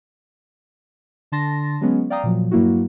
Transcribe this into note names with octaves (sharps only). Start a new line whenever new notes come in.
D3 D4 A5 C6 A6 A#6
F#3 G#3 B3 C#4
D5 F5 G5 A#5 D#6
A#2 F3 F#3
G2 F#3 A#3 E4 F#4